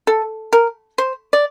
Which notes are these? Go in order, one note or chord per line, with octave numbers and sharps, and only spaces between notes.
A4
A#4
C5
D5